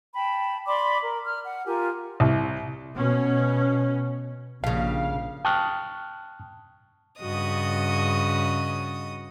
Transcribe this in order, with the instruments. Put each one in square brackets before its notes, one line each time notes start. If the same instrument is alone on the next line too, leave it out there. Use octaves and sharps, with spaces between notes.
[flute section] G5 A5 B5
D5 B5 C6 D6
A#4
F6
F#5
F4 G4 A#4 G#5
[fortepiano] C2
[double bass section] B2 C#4
[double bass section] A#1 [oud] G2 C#3 [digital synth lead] F5
[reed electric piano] G5 A5 C#6 D#6 F6 F#6
[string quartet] G2 C#3 F#4 D#5 D#6